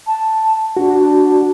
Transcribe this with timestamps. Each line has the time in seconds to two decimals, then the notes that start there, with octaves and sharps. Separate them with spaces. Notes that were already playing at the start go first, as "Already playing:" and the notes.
0.06 A5
0.77 D4 F#4